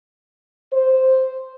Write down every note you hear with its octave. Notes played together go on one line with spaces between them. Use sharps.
C5